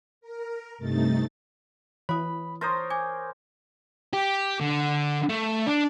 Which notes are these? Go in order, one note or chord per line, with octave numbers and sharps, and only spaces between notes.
A#4
G2 C3 A3 D#4 A6
E3 C#5 B5 D#6
A#4 C5 C#5 A#5 C6 D#6 A6
G#5 D6 G#6
G4
D3
A3
D4